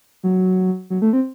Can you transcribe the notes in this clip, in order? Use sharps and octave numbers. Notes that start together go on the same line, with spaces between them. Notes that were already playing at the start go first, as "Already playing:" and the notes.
F#3
F#3
A3
C4